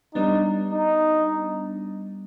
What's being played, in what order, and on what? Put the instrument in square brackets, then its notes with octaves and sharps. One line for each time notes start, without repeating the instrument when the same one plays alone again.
[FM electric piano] G3 B3 D4 [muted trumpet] D#4
[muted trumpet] D#4